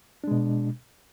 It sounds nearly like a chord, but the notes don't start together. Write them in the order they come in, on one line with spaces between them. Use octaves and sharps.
D4 G#3 B2